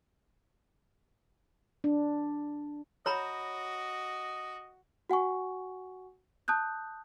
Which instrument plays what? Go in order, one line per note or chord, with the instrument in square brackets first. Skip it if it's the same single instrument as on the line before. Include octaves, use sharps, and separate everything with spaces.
[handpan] D4
[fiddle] F#4 [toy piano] C#5 A#5 B5 [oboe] D#5
[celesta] F#4 F#5 G#5 C#6
A5 D#6 F#6 G6